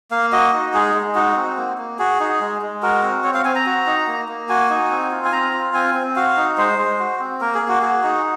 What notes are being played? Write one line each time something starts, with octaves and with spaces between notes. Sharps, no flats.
A#3 F5
F#4 D#5
D#4
G#3 G#4
G#3
D#4 F#4
C4
A#3
A#3
F#4 G#4
D#4
G#3
G#3
F#4 A#4
C4
C4 C#5
F5
C4 G#5
A#5
F#4
D#4
A#3
A#3
F#4 G#5
D#4
C4
F4
G#5
C4 A#5
F4
C4 G#5
C4
F#4 F5
D#4
G#3 C5
G#3
F#4
C4
A#3 A#4
G#4
A#3
F#4
F#4 G#4
D#4